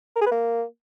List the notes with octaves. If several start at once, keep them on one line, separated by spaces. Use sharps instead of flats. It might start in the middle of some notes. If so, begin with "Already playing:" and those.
A#4
G#4
B4
A#3